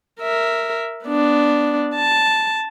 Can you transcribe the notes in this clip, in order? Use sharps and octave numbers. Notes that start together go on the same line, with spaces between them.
A#4 E5
B3 D4
A5